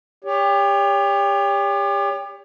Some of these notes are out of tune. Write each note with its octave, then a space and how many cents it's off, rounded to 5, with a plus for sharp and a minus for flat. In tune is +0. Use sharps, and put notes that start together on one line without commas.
G4 +35 C#5 +35